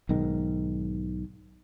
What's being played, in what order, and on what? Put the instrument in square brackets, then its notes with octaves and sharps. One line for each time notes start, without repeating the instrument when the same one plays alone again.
[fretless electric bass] B1 G#2 D#3